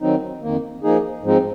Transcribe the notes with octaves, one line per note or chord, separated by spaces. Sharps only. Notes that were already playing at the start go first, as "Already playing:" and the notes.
D#3 F#3 C4 D#4
F2 D#3 A#3
F3 A#3 D#4 G#4
G#2 F3 G#3 C4 D#4